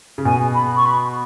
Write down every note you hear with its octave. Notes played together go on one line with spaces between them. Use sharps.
C#3
B2 G#5
B5
C#6
B5